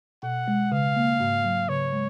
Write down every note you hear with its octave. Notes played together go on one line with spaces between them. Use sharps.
B2 F#5
G#3
C#3 F5
A#3
G#2
F#3
C#3 C#5
G#3